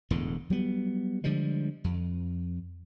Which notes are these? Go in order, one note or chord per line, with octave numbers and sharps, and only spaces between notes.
E1 E2 A2 D3
F#3 G3 B3
D3 F3 G3 G#3
F2